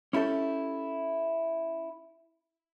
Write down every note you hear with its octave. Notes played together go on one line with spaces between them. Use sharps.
C#4 E4 G4 A4